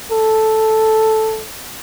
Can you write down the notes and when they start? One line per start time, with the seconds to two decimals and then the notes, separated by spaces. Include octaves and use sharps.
0.12 A4